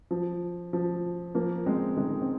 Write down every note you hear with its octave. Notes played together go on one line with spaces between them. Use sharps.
F3
F3
F3 A#3
G#3 C4
D#3 G#3
C4